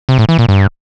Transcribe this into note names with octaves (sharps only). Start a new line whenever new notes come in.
C3
A2
E3
A#2
G2